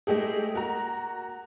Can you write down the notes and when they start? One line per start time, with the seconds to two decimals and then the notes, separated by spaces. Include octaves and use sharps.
0.07 G#3 A3 G4 G#4
0.54 A#3 F#4 A#5